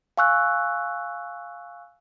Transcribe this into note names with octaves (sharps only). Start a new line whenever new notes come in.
F5 G#5 C#6 E6 F#6